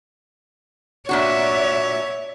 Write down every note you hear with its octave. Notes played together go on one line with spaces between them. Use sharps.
A#2 D4 F#4 C#5 D5 E5